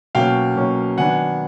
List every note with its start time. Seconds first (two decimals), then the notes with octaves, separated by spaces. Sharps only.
0.15 B2 F#3 A#3 C#4 F5 G5
0.56 B2 F#3 A#3 C#4
0.98 D#3 F#3 B3 D4 F#5 G#5